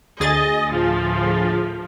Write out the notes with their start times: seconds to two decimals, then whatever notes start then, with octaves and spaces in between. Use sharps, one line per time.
0.20 D2 G#4 D#5 A6
0.70 A2 F3